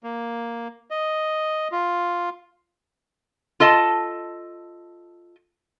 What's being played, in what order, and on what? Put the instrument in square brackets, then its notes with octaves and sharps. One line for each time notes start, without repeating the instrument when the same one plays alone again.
[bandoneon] A#3
D#5
F4
[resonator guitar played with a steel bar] F4 A4 D#5 A5